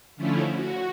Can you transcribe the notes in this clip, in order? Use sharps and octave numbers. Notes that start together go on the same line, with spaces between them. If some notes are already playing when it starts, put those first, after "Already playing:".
D3 F3 A3 C#4 E4
F#4